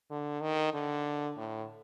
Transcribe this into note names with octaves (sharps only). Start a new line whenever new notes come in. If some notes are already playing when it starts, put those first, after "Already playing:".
D3
D#3
D3
A2